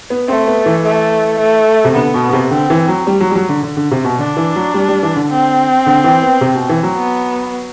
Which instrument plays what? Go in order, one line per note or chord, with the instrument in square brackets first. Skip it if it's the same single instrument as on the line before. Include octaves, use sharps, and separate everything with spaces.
[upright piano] B3
[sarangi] A3 [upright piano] C4
[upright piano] B3
E3
[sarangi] A3
A3
[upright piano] C3
[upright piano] D3 [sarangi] B3
[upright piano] B2
B2
C3
[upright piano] D3 [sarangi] C4
[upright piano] E3
F#3
G3
F#3
G3
F#3
D3
D3
D3
C3
B2
[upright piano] D3 [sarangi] D4
[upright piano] E3
F#3
G3
G3
E3
D3
[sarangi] C4
[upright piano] D3
E3
B3
C3
B2
E3
F#3
[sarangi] B3